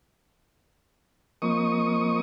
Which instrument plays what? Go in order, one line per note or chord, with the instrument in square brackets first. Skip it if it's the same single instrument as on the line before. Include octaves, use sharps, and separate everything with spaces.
[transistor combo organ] F3 A#3 C4 D#5 C#6 D#6